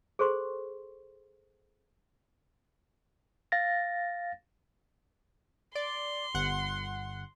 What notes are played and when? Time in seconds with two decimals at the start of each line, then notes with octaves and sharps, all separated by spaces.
0.19 G#4 A4 C5 C6 C#6
3.52 F5 A6 A#6
5.75 D5 C6
6.34 G1 F#5